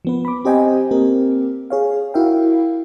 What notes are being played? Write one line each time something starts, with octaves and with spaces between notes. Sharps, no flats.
F3 B3 B4
B5 D6
C4 G4 C5 D#5 G5 G#5
A#3 C4 G4 A#4
G#4 C#5 F5
E4 F#4 A#4 E5 F5 G5